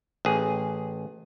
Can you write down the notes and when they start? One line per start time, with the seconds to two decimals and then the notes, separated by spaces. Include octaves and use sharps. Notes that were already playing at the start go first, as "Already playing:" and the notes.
0.25 A1 G#4